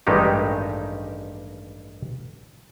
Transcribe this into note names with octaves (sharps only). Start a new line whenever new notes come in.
A1 G2 D#3 G#3 D#4 G4